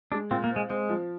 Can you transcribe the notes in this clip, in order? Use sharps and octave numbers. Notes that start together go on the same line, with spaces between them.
G#3 D4
A#2 C4
A#3
C4
G#3
G#3 C4
F3